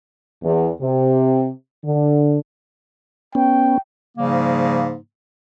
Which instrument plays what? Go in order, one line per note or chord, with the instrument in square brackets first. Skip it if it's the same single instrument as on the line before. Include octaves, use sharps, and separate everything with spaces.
[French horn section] E2
C3
D3
[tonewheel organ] B3 C#4 [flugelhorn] G5
[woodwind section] G#2 C#3 F3 G3 A#3